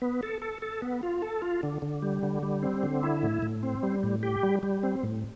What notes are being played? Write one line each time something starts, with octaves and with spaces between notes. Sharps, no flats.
B3
A4
A4
A4
B3
F4
A4
F4
D3
D3
G3
D3
G3
C4
D3
E4
A2
A2
C4
G3
A2
G4
G3
G3
C4
A2